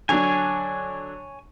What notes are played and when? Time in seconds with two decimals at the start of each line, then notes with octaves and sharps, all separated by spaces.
0.09 D3 F#3 D4 C#5 G#5